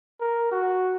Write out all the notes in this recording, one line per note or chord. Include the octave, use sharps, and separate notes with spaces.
A#4
F#4